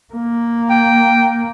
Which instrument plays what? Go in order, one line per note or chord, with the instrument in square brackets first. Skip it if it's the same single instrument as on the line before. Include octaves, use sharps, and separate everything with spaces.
[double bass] A#3
[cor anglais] G5